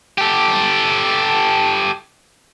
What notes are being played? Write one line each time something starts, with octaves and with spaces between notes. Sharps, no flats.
G4 A4